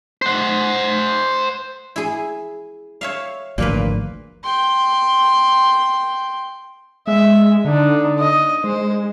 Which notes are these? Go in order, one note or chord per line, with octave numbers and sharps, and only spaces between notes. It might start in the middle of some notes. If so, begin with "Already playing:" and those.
C5 F#5
E4 G#4
C#5 E5 F5
G#1 D2 A#2 F3 A#3 B4
G5 C6
G#3 E5
D3 D4 D#4
D#5
G#3 C5